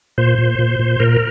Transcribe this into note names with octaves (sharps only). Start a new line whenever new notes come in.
A#2 C5
A#2
A#2
A#2
A#2 A#4